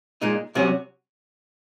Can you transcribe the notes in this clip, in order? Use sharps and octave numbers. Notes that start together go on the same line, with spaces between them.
A#2 G#3 D#4
C2 C3 F#3 C#4 F#4